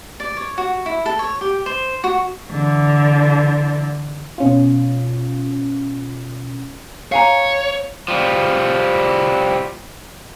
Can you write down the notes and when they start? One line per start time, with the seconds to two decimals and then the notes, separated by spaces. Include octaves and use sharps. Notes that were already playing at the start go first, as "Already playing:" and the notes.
0.20 D5
0.37 C#5
0.58 F#4
0.86 E4
1.06 A4
1.19 C#5
1.41 G4
1.66 C5
2.04 F#4
2.50 D3 E3
4.38 B2 C#4 F4
7.12 C#5 F5 G#5 A#5
8.08 F3 G3